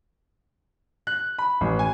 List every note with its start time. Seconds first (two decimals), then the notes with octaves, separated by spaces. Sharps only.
1.07 F#6
1.39 B5
1.61 A1
1.79 G#5